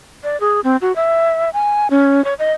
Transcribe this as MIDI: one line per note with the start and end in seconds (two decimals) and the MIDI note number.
0.24 0.39 74
0.40 0.60 68
0.64 0.77 60
0.82 0.94 66
0.96 1.50 76
1.53 1.88 80
1.90 2.24 61
2.25 2.34 73
2.39 2.53 75